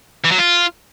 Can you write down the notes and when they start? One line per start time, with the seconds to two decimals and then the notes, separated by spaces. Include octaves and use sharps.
0.24 E3
0.31 F#3
0.38 F4